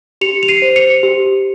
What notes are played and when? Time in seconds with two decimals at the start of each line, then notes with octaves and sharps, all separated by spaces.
0.21 G4 C#7 F7
0.43 F7
0.48 C7 D#7
0.62 C5
0.76 C#7 F7
1.03 G4